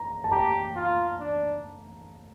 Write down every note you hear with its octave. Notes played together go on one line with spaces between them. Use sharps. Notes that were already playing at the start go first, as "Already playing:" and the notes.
Already playing: A#5
A5
G4 A#5
F4
D4